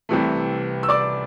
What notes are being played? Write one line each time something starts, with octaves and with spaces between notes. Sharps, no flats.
C2 C3 E3 A3
E6
D5 D6